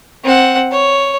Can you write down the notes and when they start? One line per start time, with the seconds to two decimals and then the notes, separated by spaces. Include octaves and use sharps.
0.23 C4 F#5
0.71 C#5